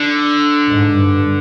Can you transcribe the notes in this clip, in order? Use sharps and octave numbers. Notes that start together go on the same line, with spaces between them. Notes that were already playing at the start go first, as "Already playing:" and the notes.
Already playing: D3
G#2
G2